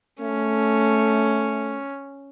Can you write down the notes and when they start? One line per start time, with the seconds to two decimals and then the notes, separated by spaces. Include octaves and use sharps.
0.21 A3 C#4